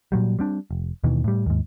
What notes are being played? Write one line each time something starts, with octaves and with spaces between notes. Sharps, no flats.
A#2 F#3 G3
G3 C4 D4
F1
D#2 B2 D#3 E3
A2 G3
D#2 G#2